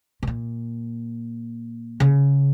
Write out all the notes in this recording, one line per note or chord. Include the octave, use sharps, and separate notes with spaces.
B2
A#2
C#3